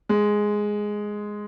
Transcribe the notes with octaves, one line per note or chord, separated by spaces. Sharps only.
G#3